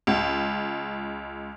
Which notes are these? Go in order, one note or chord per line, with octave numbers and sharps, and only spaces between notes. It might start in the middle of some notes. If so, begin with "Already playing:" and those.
C#2